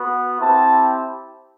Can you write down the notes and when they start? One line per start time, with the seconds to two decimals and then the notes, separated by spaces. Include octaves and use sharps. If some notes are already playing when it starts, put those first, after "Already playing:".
Already playing: B3 F#4
0.38 C4 E4 G4 A5